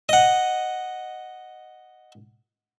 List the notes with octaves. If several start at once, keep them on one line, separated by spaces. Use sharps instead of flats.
D#5 F#5